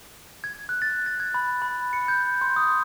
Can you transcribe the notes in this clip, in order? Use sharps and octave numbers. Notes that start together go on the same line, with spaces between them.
G#6
F#6
A6
A6
G#6
B5
B5
C#7
G6
C6
D#6